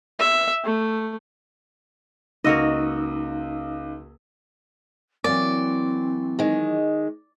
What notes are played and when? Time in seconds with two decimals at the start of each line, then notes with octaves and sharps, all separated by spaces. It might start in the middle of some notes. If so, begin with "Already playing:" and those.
0.19 E5
0.64 A3
2.44 C#2 A#3 D#4 F#4 D#5 E6
5.24 E3 F#3 A#3 C4 D5
6.39 D#3 G#3